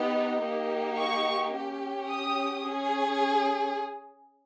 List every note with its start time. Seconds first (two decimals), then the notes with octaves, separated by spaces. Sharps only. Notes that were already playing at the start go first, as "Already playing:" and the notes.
Already playing: B3 D#4 G4
0.41 A#3 D#4 G4
0.97 C#6
1.53 C#4 G4
2.10 D#6
2.67 C#4 G#4